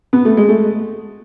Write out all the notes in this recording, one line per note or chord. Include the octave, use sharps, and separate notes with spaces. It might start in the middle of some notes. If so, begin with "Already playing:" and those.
B3
A3
G#3
A3